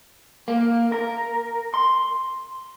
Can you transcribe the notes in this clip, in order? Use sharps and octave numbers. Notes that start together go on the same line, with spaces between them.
A#3
A#4
C6